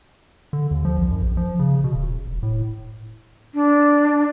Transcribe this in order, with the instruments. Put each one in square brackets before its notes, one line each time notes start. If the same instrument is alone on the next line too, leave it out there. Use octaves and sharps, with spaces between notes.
[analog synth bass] D3
D#2
F3
C2
F#2
A#1
F3
C#3
B2
D#1
E1
A2
[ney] D4